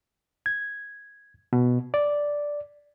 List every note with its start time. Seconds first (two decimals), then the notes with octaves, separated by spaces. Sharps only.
0.46 G#6
1.53 B2
1.94 D5